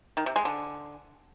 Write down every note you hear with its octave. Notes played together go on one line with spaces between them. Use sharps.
D#3
C3
G#3
D3